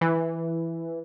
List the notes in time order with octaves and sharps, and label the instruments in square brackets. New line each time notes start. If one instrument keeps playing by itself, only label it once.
[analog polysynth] E3